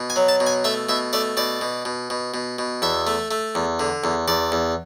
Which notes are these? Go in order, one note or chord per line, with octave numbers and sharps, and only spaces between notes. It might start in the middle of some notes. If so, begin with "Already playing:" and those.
Already playing: B2
G#5
F#3
A5
B2
G#5
A3 E5
B2 E5
A3 D5
B2 D5
B2
B2
B2
B2
B2
E2 E5
A3
A3
E2
D3
E2
E2 D5
E2